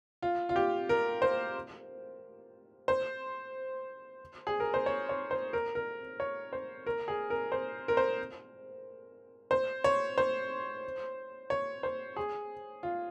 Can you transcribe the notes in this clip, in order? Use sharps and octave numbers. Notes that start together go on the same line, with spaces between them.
F4
F4
G4
A#4
C5
C5
G#4
A#4
C5
C#5
C#5
C5
A#4
A#4
C#5
C5
A#4
G#4
A#4
C5
A#4
C5
C5
C#5
C5
C#5
C5
G#4
F4